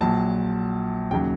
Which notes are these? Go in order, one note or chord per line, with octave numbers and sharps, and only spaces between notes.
A#1 A#2 F#3 A5
D#2 C#3 F#3 G5